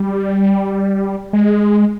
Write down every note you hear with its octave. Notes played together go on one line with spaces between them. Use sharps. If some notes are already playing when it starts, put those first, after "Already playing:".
Already playing: G3
G#3